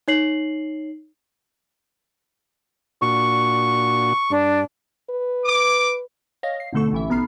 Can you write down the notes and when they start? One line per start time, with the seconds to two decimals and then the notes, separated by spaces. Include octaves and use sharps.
0.08 D#4 C#5 C7 F#7
3.02 A#2 D4 F#4 C#6
4.30 G2 D4
5.10 B4
5.45 D6
6.43 C#5 D#5 F5 A#6
6.60 C7
6.73 G#1 B2 D3 A3 A4 C#6
6.93 A1 E3 E5
7.09 B1 B3 A#5 B5 F6 C7